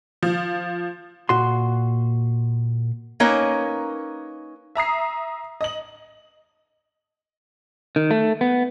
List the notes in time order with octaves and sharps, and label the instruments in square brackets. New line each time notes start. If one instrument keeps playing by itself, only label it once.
[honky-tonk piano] F3
[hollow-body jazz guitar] A#2 F#4 C6
[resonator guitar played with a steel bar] A#3 C#4 D#4 A#4 B4 C#5
[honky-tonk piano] E5 A#5 D#6 C7
D#5 F#7
[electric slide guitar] D#3
A3
B3